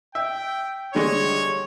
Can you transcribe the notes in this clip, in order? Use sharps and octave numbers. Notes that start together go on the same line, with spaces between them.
E5 G5
D3 G3 G#3 C#5